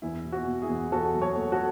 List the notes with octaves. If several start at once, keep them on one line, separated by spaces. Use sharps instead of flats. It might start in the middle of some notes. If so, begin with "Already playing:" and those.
E2 E4
B2
F#4
B2
E4 G#4
E2
E2 F#4 A4
F#3
A4 C#5
A3
F#4 A4